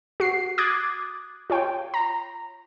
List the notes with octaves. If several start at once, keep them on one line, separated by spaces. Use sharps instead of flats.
F#4 C7
D6 D#6 F#6 G#6 A6
F4 C#5 G5
A#5